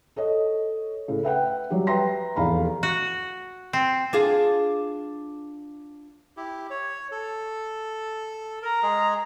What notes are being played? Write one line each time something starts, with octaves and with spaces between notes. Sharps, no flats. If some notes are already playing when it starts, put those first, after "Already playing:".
A4 C#5 D#5
A2 C#3
B4 E5 F#5 G5
F#3 G3 F#4 G4
B4 E5 G5 A#5 C6 A#6
F1 E2 F5 A#5 B5
F#4
C4
D4 F4 G#4
E4 G4
C#5
A4
A#4 A#5
G#3 G#4